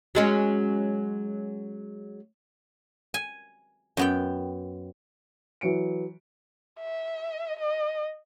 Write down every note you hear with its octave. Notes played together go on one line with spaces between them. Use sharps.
F#3 G#3 C#4
G#5
F#2 B3 G5
E3 F#3 C#7 D7
E5
D#5